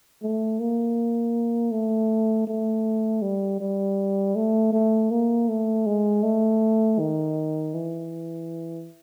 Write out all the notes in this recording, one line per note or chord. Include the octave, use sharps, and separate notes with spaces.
A3
A#3
A3
A3
G3
G3
A3
A3
A#3
A3
G#3
A3
D#3
E3